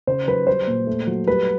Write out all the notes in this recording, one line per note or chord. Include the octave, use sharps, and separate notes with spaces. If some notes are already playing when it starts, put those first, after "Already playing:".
C#3 C5
F#3 B4
G3 C5
A#2
A3
F#3
G3 B4